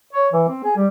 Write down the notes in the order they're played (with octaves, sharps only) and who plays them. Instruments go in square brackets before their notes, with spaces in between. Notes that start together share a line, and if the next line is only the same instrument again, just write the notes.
[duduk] C#5
E3
C4
G#4
G3